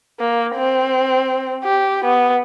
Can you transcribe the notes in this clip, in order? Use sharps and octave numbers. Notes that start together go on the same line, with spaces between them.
A#3
C4
G4
B3